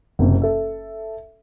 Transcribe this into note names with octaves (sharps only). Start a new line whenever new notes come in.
F#1 C3
A4 E5